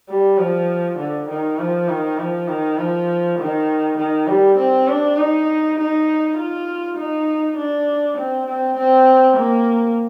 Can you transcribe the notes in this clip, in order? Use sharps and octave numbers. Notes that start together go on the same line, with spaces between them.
G3
F3
D3
D#3
F3
D#3
F3
D#3
F3
D#3
D#3
G3
C4
D4
D#4
D#4
F4
D#4
D4
C4
C4
C4
A#3